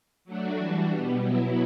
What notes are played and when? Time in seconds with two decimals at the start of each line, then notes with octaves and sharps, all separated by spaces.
0.25 F#3 A3 D4 F#4
0.57 E3 G3 D4 F#4
0.89 B2 G3 B3
1.21 B2 F#3 B3 E4